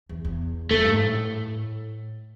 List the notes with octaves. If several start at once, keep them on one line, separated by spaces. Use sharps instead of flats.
E2
E2
F2 A3
G2
G#2
A2